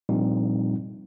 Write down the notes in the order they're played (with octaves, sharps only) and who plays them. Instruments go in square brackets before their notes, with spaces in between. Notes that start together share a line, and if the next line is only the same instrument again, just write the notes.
[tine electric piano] A#2 F3 G3 C4 D4 D#4